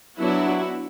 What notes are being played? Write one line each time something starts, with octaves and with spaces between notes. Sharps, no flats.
F#3 B3 D4 E4 F#4